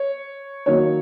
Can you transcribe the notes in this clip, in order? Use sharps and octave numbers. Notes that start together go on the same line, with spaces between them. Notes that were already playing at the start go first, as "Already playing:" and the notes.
Already playing: C#5
D#3 F#3 A#3 C#5